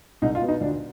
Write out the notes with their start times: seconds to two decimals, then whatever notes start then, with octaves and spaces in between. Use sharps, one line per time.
0.22 C2 D#4
0.35 F4
0.42 B2 B3
0.49 D#4
0.61 D2 D4